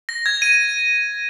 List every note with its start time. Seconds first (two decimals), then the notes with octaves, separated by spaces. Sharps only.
0.09 A#6
0.26 G#6
0.42 D#7